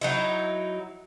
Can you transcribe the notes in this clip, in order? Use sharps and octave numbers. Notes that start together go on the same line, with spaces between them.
F#3 D#4 E4